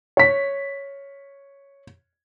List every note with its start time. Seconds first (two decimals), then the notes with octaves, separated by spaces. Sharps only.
0.17 C#5 B6